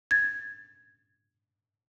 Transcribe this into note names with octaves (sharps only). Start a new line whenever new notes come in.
G#6 A6